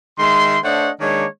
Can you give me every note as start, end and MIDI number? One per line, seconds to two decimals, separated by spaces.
0.19 0.57 51
0.19 0.57 56
0.19 0.57 76
0.19 0.57 84
0.63 0.90 57
0.63 0.90 62
0.63 0.90 72
0.63 0.90 73
0.63 0.90 75
0.63 0.90 78
1.00 1.25 51
1.00 1.25 56
1.00 1.25 58
1.00 1.25 62
1.00 1.25 73